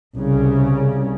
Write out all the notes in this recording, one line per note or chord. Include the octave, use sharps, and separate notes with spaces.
C2 C#3